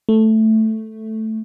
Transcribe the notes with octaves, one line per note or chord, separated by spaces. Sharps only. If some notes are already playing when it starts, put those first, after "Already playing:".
A3